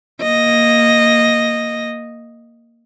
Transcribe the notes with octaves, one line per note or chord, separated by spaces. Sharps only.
A#3 D#5